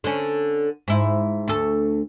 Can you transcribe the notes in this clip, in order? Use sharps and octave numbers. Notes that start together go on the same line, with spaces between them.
D3 C#4
G#2 E4
D2 A4